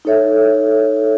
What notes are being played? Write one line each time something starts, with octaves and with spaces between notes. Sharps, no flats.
D#4 A4 C#5 E5